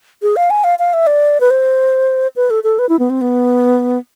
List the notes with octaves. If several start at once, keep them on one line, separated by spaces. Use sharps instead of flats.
G#4
F5
G#5
F5
F5
E5
D5
B4
C5
B4
A4
A4
B4
E4
B3
C4
B3